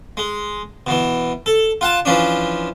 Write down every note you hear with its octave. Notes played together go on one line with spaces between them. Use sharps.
G#3
B2 E3
A4
F4 F#5 A5
E3 F3 C#4 D4